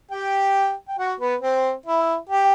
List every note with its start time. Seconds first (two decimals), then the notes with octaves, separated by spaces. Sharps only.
0.11 G4 G5
0.88 G5
0.99 F#4 F#5
1.20 B3 B4
1.41 C4 C5
1.86 E4 E5
2.30 G4 G5